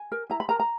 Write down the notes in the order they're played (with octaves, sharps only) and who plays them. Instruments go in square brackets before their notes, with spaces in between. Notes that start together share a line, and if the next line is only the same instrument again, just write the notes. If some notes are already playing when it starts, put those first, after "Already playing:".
Already playing: [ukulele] G#5
A#4
E4 A#5
B5
A#4 A#5
A#5